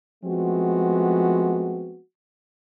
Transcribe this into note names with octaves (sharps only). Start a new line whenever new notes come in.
F3 G#3 A3 B3 C4 F#4